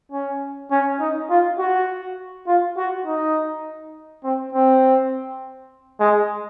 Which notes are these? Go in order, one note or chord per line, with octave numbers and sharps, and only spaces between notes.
C#4
C#4
D#4
F4
F#4
F4
F#4
D#4
C4
C4
G#3